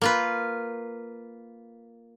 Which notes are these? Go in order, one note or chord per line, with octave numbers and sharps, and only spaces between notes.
A#3 F4 B4